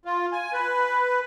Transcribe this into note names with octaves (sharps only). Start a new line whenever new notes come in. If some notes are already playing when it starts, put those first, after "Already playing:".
F4
G#5
B4